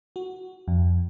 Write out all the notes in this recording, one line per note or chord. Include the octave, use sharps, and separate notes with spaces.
F#4
F2